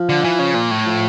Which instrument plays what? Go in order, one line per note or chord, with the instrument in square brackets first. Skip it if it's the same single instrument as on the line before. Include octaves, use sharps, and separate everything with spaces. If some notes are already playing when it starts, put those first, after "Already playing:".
Already playing: [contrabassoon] F3
[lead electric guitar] D3
E3
C#3
A#2
A2
[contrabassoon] F3